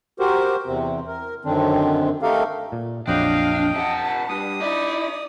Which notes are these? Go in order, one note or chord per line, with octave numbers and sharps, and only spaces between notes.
F#4 G4 A#4 C5
E2 C3 C4
A#4
F#2 D3 D#3 C4 D4
A3 D#4 G4 A4 A#4 F5
A#2
A#1 F2 F#3 D4 D#5 F5 G5
C3 E5 F#5 A5
G2 D#6
D#4 E4 D5